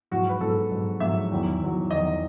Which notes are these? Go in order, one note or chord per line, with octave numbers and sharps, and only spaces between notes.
G#2 F#3 F#4
B4
G#2 F#3 A4
G#2 F#3
G#2 F#3 E5
E2 D#3 F#3
E2 D#3 F#3
E2 D#3 F#3 D#5